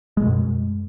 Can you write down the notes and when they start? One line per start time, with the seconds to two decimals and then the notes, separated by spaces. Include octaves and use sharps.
0.17 G#3
0.22 B2
0.27 F#2